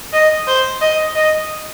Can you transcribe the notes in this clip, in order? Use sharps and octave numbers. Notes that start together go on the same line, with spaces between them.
D#5
C5
D#5
D#5